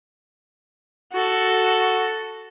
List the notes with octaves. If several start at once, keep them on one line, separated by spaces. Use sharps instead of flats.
F#4 A4